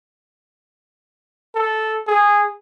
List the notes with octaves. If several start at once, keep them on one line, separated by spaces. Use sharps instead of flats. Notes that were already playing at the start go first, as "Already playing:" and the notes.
A4
G#4